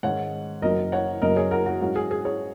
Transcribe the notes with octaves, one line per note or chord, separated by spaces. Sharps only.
G#2 D#3 G#3 C#4 C#5 F#5
F#1 F#2 F#3 D#4 A#4 D#5
C#5 F#5
F#1 F#2 F#3 A#3 A#4 D#5
G#4 C#5
F#4 A#4
F#4
G#2 F#3 C#4 F#4
G#4
G#4
G#4 C#5